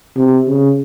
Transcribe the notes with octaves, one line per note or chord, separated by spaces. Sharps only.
C3
C#3